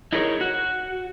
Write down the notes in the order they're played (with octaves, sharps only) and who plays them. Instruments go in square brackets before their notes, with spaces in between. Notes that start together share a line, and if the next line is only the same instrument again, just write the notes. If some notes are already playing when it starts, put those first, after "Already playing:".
[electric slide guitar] D#4 E4 G#4 A#4 C#5
F#4